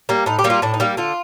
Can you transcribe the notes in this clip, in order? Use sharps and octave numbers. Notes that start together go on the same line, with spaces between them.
G3 A#3
A2 D#4
G4
G3 A#3
F4
A2 D4
D#4
G3 A#3
D3 F4